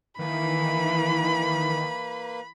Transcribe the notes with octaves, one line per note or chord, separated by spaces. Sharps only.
D#3 E3 A#3 B4 B5